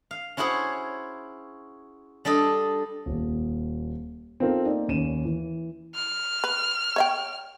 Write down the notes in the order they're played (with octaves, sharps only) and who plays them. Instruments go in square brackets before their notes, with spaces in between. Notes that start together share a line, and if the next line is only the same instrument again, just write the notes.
[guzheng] F5
C#4 E4 F#4 G#4 C5 C#5
G3 D4 A4 D#5
[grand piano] D#1
C4 D#4 F4 A4 A#4 C5
A#3 D#4 D5
D#2 C#4 D#7 E7
E3
[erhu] F6
[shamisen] B4
C#5 E5 G5